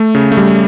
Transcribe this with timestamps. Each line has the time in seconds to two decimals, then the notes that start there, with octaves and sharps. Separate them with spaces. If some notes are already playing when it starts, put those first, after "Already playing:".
Already playing: A3
0.15 C#3
0.32 A3
0.37 G3